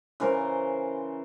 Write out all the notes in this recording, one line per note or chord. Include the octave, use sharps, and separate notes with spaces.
C#3 E3 A#4 C5